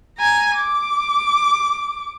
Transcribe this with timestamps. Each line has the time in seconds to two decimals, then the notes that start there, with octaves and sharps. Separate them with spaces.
0.18 G#5 A#5
0.56 D6